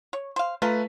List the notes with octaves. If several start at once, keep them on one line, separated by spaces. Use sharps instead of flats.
C#5
C5 F5
A3 F4 B4 A5 A#5 B6